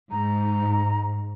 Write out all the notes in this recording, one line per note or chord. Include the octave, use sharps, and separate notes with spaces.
G#2 A#5